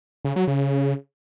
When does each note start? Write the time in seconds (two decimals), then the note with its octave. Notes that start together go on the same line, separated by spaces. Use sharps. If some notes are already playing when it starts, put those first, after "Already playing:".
0.25 C#3
0.36 F#3
0.48 C#3